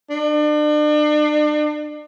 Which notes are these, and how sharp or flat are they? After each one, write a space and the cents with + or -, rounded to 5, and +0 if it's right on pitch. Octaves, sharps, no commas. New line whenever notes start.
D4 +40